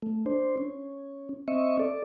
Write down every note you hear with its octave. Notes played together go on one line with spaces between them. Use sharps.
A3
D4 C5
C#4
C4 D#5 E5 C#6
A4 D5